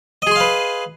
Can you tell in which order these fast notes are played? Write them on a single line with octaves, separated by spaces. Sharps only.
D#5 G#4 C6 F5 B4